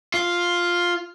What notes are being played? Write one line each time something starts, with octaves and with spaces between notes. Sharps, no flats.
F4